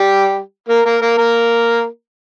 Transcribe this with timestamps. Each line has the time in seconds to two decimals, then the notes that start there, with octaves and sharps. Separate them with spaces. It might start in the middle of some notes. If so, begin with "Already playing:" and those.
Already playing: G3 G4
0.69 A#3 A#4
0.85 A#3 A#4
1.02 A#3 A#4
1.18 A#3 A#4